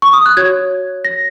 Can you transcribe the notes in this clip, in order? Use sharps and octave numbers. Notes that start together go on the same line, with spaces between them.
C#6
D#6
F#6
F#4 C#5 G#6
A#6